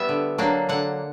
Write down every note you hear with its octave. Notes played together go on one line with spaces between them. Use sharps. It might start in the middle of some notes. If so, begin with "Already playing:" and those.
Already playing: G3 B3 E5
D3
F#3 A#3 D4
D3 F#5